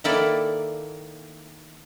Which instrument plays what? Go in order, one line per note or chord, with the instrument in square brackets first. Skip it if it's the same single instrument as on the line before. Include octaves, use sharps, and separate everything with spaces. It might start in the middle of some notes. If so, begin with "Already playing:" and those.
[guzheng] D#3 A#3 E4 A4 D5